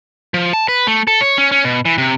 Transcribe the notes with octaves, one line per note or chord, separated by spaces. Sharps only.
F3
A5
B4
A3
A4
C#5
C#4
C#4
B2
E3
C3